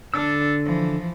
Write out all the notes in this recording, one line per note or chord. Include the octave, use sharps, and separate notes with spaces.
D3 D4 A4 E6
E3 F3